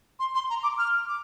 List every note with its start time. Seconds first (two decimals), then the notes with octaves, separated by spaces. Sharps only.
0.19 C6
0.35 C6
0.50 A#5
0.63 D6
0.78 F6
1.08 D6